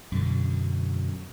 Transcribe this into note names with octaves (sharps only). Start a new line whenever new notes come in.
F#2 B2 D3